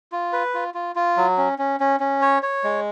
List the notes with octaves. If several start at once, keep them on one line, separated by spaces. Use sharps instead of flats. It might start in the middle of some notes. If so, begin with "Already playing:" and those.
F4
B4
F4
F4
F4
F#3
C#4
C#4
C#4
C#4
C#5
C#5
G#3